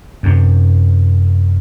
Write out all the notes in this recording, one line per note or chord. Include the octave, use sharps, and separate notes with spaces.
F#2 C3